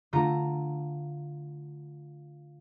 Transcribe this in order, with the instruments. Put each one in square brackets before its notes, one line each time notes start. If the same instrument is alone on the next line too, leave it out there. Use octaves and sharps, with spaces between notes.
[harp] D3 A3 F4 A#5